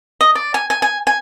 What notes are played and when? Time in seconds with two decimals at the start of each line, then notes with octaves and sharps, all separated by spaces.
0.21 D#5
0.35 D5
0.54 G#5
0.70 G#5
0.82 G#5
1.07 G#5